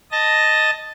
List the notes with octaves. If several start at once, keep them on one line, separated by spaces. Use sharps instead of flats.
D#5 A5 A#6